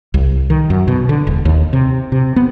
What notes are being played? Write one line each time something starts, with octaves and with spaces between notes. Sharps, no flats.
C2
D#3
F#2
B2
D3
E1
D#2
C3
C3
B3